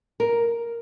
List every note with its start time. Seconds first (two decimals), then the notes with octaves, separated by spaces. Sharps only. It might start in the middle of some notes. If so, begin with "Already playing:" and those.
0.20 A#4